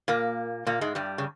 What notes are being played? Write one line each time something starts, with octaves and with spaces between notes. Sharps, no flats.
A#2 A#3
A#2 A#3
G#2 G#3
G2 G3
C#3